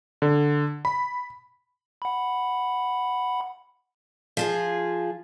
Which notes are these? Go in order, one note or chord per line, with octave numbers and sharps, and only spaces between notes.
D3
B5
F#5 B5
F3 F4 G#4